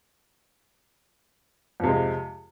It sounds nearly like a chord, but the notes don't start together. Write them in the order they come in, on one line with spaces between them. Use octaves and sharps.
F2 C3 G#3